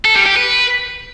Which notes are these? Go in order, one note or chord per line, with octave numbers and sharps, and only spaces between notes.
A4
G3
G4
B4